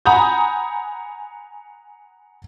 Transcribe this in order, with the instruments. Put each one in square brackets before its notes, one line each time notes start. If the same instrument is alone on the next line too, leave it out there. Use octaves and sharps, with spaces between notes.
[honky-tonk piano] F#5 G#5 A#5 B5 D#6 G6